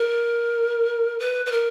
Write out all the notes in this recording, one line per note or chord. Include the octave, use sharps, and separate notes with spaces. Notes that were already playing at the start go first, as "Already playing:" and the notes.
Already playing: A#4
B4
B4
A#4